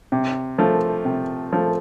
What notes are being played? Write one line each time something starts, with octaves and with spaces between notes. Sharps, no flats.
C3
F3 A3
C3
F3 A3